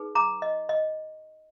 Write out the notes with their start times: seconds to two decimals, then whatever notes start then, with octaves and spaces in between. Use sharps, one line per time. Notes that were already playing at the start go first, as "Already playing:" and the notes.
Already playing: D#4 G#4 B4
0.15 A#5 D6
0.42 D#5
0.69 D#5